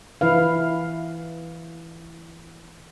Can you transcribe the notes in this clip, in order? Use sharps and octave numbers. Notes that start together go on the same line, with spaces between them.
E3 E4 B4 F5